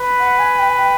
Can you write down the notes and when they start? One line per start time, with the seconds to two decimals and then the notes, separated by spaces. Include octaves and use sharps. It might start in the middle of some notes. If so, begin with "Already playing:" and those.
Already playing: B4
0.20 F#5
0.39 G#5
0.59 G5
0.69 G#5
0.77 G5